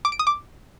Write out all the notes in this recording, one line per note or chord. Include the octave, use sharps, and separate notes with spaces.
D6
D7
D#6
D6